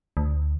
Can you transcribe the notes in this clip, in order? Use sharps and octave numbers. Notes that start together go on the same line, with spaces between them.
D2